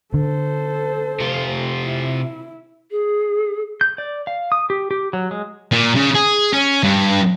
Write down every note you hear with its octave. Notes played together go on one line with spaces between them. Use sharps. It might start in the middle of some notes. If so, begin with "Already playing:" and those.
D3 A4 C5
C3 F4
E4
G#4
G6
D5
F5
D#6
G4
G4
F#3
G#3
A#2
C#3
G#4
C#4
G2